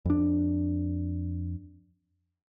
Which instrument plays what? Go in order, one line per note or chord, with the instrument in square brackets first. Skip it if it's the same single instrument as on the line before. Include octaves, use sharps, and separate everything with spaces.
[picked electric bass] F2 D4